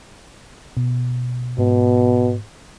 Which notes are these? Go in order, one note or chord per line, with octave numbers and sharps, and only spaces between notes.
B2
G#2 B2